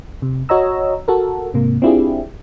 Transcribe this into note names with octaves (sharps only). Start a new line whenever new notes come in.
C3
F#4 C#5 D#5 A#5 E6
F#4 A4 A#4
G#2 C3 A#3
C4 D4 E4 F4 G4 G#4